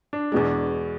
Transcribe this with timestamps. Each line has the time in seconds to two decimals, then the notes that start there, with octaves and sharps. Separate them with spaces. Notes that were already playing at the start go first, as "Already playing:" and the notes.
0.13 D4
0.32 E2 B2 G#3